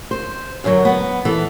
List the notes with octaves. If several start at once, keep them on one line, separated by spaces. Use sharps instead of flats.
C5
F#2 D3 E3 F#3
B3
E3 A4